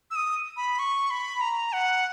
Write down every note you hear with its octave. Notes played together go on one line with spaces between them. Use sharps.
E6
D#6
B5
C#6
B5
A#5
F#5